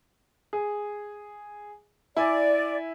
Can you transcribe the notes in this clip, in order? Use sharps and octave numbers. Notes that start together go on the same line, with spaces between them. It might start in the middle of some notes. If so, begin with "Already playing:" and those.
G#4
E4 D5 G#5